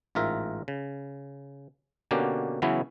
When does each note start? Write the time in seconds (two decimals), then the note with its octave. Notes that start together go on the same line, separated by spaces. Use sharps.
0.15 A1 G#2 F4 A#4 E5
0.68 C#3
2.11 B2 D3 A#3 C#4 F#4 G4
2.62 C#3 E3 F#3 B3 C#4 E4